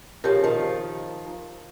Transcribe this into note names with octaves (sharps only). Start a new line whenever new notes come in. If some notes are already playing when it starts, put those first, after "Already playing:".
C#3 F3 G4 A#4
D#3 F3